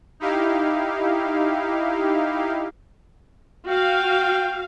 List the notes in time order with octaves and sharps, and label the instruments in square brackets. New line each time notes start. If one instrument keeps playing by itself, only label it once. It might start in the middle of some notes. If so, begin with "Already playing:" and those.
[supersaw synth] D#4 E4 G4 F5
[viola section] F#4 F5 [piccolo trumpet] G5